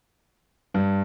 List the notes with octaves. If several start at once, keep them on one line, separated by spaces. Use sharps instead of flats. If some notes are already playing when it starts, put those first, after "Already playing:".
G2